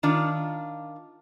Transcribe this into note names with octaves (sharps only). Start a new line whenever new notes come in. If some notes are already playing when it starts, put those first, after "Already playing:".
D#3 D4 F4